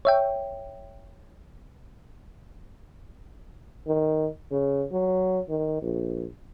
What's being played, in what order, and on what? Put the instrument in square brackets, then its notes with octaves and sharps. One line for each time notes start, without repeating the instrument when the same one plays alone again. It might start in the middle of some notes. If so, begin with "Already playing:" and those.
[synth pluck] C#5 E5 G5
[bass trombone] D#3
C#3
F#3
D#3
A#1